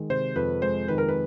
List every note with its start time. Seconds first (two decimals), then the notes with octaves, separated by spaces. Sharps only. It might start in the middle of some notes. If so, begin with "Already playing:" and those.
Already playing: D#3 G#3
0.10 C3 C5
0.36 F2 B4
0.62 G#3 C5
0.88 D#3 B4
0.98 A#4
1.09 B4